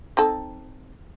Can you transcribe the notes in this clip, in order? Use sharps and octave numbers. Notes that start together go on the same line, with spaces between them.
C4 D#4 A4